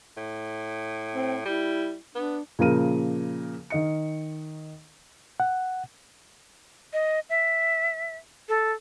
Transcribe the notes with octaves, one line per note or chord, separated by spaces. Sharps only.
A2
C4
G3 E4
B3 D4
A#2 C#3 F3 A#4 D#7
D#3 D#5 C#7
F#5
D#5
E5
A4